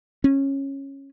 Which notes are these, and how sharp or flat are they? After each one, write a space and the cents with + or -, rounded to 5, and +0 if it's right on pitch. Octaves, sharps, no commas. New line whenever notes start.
C#4 -15